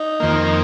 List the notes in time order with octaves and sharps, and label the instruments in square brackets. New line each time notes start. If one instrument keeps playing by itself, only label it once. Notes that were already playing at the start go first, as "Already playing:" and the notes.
Already playing: [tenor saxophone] D#4
[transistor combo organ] F2 D#3 A#3